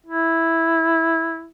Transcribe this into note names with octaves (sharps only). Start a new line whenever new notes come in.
E4